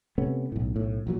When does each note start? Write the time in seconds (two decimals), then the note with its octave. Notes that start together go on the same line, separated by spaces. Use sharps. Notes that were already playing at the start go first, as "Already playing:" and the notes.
0.18 C3 A3 B3 C#4
0.52 B1 A2
0.76 B1 A2
1.07 A#1 A#2 F#3